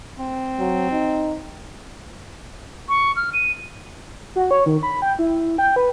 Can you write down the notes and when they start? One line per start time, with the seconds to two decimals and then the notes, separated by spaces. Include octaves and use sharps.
0.19 C4
0.59 F#3
0.92 D#4
2.89 C#6
3.16 F6
3.33 D#7
4.36 F#4
4.51 C#5
4.66 D#3
4.83 B5
5.02 G5
5.19 E4
5.58 G5
5.76 B4